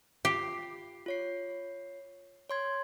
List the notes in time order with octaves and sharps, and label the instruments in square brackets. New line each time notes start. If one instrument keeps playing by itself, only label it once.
[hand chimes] F4 C7 [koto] G4
[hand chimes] F4 C#5 C7
C#5 C6 G#6